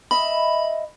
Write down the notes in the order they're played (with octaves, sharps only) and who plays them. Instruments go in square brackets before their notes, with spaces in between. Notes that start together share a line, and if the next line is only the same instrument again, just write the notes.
[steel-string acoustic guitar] D#5 E5 [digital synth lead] B5